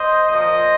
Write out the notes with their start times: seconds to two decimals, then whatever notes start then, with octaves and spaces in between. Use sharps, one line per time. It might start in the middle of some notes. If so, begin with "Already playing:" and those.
Already playing: C5 D#5
0.31 A#2 F3 C5 D#5